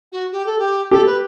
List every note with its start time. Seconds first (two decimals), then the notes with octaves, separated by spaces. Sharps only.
0.12 F#4
0.32 G4
0.46 A4
0.59 G4
0.91 G4 A4
1.06 B4